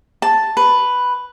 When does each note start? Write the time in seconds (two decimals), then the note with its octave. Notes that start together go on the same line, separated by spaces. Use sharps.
0.22 A5
0.57 B4